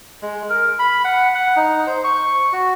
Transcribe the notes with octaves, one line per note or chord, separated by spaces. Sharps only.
G#3
A#4
B5
F#5
F#5
D#4
C5
C#6
F#4